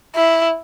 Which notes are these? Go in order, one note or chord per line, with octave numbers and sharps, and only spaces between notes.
E4